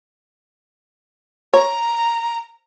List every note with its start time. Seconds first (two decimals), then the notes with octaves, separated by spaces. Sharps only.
1.54 C#5 A#5